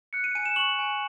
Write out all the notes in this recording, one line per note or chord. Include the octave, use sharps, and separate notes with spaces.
F#6 C#7
D#7
G#5 D#7
E7
C#6 F#7
G#5